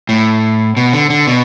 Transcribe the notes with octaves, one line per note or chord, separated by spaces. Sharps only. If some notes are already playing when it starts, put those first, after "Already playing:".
A2
B2
D3
D3
B2